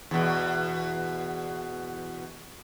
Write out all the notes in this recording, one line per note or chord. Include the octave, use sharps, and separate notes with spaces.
E2 B2